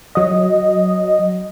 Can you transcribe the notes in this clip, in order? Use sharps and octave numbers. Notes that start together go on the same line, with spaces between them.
F#3 D#5